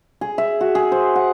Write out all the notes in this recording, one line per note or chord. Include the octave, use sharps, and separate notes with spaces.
G#4
E5
F#4
G#4
C5
F#5